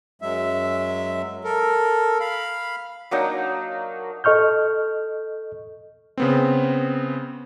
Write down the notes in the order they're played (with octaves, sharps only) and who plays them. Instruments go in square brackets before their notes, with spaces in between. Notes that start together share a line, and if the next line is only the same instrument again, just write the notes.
[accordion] F#2 F#3 G#3 E5
A4 A#4
F5 B5
[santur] F#3 A#3 D4 D#4
[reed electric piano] A4 D#5 C#6 F6 G6
[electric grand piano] C#3 B3 C4